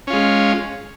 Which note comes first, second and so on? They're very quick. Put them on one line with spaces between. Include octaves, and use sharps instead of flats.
C#4 F4 G#3